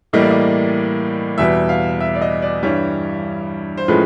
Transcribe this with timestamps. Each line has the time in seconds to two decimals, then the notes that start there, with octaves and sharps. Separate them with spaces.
0.13 A2 E3 G3 A#3 D#5
0.21 D5
0.31 D#5
1.38 E2 B2 G3 B3 E5
1.69 F5
2.00 E5
2.15 D5
2.21 D#5
2.42 D5
2.63 G2 E3 G3 C#5
3.77 C5
3.88 A2 F3 G#3 C#4 B4